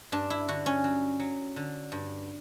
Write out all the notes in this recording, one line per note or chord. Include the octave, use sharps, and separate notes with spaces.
G2 D4
E4
D3 F#4
C#4
F#3
F#3
D3
G2